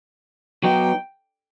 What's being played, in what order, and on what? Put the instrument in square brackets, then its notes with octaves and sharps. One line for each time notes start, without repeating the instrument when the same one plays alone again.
[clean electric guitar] F#3 B3 D#4 [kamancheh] G5